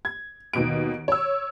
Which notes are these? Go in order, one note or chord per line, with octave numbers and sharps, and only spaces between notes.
G#6
D#2 B2 D7
C#5 E6